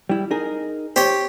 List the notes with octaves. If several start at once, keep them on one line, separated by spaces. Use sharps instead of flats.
G3 E4
D#4 G#4 A#4
G4 C5 C#5